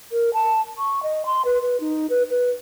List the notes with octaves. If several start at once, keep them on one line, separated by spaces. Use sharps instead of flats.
A#4
A5
C#6
D#5
C6
B4
B4
D#4
B4
B4